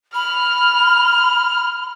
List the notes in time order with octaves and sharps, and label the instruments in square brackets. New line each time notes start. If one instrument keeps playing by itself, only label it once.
[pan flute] B5 [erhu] F6